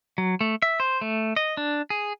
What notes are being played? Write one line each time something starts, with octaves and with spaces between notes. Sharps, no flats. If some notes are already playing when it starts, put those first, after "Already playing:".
F#3
A3
E5
C5
A3
D#5
D4
G#4